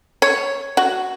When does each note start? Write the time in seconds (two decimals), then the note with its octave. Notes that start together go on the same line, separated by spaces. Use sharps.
0.22 C#5
0.77 F#4